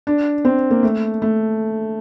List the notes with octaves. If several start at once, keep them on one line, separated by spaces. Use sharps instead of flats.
D4
C4
A#3
A3
A3